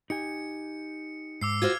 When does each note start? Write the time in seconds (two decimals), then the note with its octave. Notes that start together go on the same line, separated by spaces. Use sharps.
0.10 D#4 G4 G#5 C#7
1.41 G#2 D6 E6 C7
1.62 F4 F#4 C5 F6 G#6